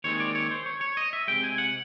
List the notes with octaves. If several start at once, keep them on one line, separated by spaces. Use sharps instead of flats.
D#2 D#3 G#3 C4 C#5
D5
C#5
C5
C#5
C#5
D#5
E5
C3 D#3 G#3 G5
G#5
F#5